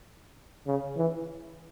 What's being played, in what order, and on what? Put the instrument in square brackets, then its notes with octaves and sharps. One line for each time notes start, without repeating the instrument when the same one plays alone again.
[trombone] C#3
E3